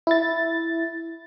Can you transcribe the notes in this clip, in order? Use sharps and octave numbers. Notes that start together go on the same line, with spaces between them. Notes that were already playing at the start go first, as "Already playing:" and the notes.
E4 A6